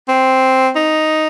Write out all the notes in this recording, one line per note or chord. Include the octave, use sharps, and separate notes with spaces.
C4
D#4